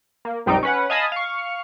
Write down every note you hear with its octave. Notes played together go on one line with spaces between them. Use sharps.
A#3
B1 F#2 G3 C4 D#4 D7
C#4 B4 F#5
D#5 F5 G#5 A5 B5 D#6
F5 C#6